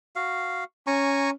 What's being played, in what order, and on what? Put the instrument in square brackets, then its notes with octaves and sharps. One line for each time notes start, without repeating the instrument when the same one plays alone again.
[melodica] F#4 F5
[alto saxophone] C#4 [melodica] G#5 A#5 C#6